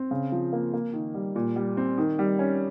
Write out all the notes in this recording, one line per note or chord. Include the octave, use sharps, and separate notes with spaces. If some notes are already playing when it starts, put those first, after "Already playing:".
Already playing: C4
C#3
F3
A#3
A#3
D#3
G3
A#2
G3
C4
D#3
G3
C#4